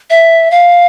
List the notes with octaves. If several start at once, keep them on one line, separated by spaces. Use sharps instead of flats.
E5
F5